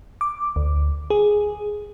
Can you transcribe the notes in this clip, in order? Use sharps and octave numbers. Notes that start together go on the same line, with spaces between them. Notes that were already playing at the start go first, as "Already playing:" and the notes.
D6
D2
G#4